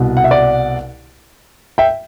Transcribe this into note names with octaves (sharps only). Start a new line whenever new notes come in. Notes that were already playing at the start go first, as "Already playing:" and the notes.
Already playing: C2 B2
F#5
E5
D5 F#5
E5 G5